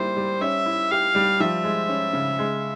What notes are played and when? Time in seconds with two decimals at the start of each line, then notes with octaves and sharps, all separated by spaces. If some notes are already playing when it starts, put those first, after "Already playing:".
Already playing: G3 A#3 E4 C5
0.17 G3
0.41 C#4 E5
0.66 E4
0.91 G4 F5
1.15 G3
1.40 F3 E5
1.64 G#3
1.89 C#4
2.13 C#3
2.39 G#3